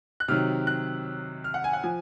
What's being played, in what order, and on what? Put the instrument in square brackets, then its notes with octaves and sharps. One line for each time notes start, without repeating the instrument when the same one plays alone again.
[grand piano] F#6
C3 D#3 F#3 F6
F#6
F6
F#5
G#5
F#5
F3 G#5